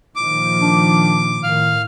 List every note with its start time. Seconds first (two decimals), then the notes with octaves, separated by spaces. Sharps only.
0.16 A#2 D#3 F3 D6
0.61 D4
1.43 A2 D#3 F5 F6